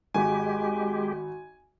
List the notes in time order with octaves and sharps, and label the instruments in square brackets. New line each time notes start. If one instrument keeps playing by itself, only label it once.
[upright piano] G#1 F#4 [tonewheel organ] G#3 G4 [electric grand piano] G#5